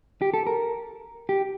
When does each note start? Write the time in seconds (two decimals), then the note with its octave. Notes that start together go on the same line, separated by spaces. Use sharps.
0.22 G4
0.34 A4
0.47 A#4
1.29 G4